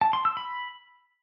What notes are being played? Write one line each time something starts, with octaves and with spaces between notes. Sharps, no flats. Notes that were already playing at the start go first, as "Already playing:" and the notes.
A5
C6
E6
B5